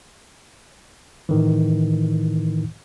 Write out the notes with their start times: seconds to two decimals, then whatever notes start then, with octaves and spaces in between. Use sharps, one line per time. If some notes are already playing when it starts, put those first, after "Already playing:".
1.29 A2 D#3 E3